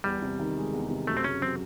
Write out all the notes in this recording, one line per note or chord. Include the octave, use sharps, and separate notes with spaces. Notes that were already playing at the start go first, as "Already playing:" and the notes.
E2 G3
C3
D#3
G#3
E2
C3
F#2 A3
C4
C#3 C#4
F#3 C4